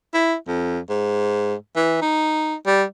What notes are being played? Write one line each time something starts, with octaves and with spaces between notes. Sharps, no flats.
E4
F2
G#2
E3
D#4
G3